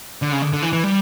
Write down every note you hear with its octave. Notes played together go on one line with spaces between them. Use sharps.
D3
C#3
D3
D3
E3
E3
G3